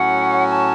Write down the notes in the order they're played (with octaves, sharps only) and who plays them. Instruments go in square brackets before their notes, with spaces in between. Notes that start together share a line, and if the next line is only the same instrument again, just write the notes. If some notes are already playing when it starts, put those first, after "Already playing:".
Already playing: [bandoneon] A2 F#3 C#4 F#4 [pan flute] F#5
[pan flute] A5